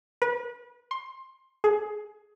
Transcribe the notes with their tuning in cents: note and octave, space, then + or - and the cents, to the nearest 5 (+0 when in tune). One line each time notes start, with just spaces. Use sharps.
B4 -30
C6 +20
G#4 +20